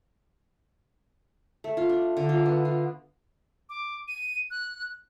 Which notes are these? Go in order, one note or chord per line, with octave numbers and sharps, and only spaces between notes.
A3
F4
D4
D3
F4
B3
F4
D6
D#7
F#6